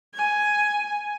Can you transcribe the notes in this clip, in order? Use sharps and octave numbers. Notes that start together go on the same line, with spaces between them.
G#5